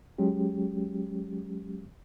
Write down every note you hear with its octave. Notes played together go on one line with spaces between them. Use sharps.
F#3 G#3 C#4 G4